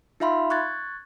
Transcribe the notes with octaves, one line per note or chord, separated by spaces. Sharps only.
D#4 F4 E5 F5 B5 C6
C#6 F#6 G#6 A6